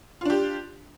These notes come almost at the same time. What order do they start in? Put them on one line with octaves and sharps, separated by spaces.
F4 D4 G4